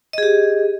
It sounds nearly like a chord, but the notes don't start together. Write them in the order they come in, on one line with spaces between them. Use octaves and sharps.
D#5 G#4 G4